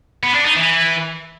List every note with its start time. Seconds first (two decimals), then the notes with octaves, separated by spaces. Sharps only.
0.23 B3
0.34 D4
0.45 D#4
0.56 E3